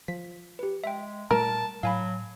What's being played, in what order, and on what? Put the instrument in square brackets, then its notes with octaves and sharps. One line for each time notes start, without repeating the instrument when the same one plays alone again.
[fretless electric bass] F3 [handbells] B6
[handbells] G4 B4
[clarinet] G#3 [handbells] E5 G5
[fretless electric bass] A#2 G3 A3 [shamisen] A#4 [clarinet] A5 [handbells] F6
[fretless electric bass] A2 [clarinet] F#3 [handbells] F5 G#5 B5